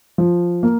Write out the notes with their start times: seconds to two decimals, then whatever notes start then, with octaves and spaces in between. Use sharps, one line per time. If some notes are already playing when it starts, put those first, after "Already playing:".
0.18 F3
0.63 A#3